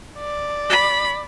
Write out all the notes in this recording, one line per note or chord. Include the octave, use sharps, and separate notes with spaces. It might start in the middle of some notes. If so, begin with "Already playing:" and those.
D5
B5